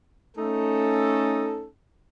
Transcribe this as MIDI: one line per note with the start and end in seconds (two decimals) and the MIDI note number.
0.37 1.66 57
0.37 1.66 61
0.37 1.66 63
0.37 1.66 69